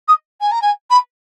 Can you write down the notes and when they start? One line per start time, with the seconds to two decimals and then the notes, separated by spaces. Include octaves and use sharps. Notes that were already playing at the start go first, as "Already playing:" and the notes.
0.08 D#6
0.41 G#5
0.52 A#5
0.62 G#5
0.90 B5